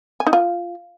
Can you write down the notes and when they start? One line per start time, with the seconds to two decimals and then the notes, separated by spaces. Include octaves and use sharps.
0.20 G#5
0.27 D#4
0.33 F4